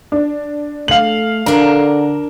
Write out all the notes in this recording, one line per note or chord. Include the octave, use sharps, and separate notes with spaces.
D4
A3 F5 F#7
D3 D4 A#4 A#5